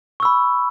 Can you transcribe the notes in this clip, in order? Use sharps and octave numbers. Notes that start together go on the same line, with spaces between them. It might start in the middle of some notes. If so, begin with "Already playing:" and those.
B5 C#6 E6